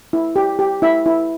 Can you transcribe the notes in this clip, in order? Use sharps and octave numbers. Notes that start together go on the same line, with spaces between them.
E4
G4
G4
E4 E5
E4